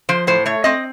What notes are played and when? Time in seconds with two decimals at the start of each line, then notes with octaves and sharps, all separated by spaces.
0.09 F3 C5
0.27 A2 C5
0.46 A3 C#5
0.64 C4 D#5